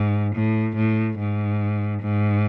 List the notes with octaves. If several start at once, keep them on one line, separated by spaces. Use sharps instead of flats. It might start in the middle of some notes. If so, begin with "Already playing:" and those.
Already playing: G#2
A2
A2
G#2
G#2